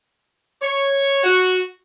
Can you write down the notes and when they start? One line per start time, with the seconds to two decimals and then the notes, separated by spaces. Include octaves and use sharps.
0.62 C#5
1.24 F#4